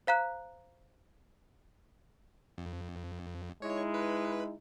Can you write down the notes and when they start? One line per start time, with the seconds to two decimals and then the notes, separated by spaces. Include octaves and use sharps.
0.07 C5 F5 A#5 F#6
2.58 F2
3.62 G#3 D#4 E4 C#5
3.94 B4